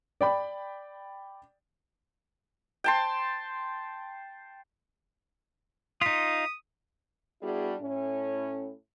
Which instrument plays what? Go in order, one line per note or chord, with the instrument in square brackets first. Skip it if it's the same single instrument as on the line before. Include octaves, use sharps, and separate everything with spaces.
[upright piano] D5 G5 B5
[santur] G5 A5 C6
[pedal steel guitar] D#4 F4 [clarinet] D#6 [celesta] B6 D#7
[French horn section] G3 B3 D4 E4 F#4 G#4
A2 C#4